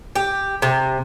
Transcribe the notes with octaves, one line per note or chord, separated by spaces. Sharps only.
G4
C3